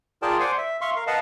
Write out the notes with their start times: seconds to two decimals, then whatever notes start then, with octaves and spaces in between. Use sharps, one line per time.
0.22 F4 G#4 A#4 D5 G5 A5
0.40 C5 D5 F#5 G#5 C6 D6
0.58 E5
0.81 E5 F5 C6 C#6
0.96 A#4 F5
1.07 B4 D#5 F5 F#5 A5